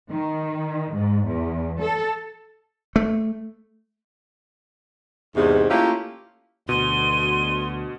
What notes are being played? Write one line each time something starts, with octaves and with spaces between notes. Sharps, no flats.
D#3
G#2
E2
A4
A3
E2 G#2 C3
A3 A#3 C#4 E4 F4 G4
D2 B2 C6 D#7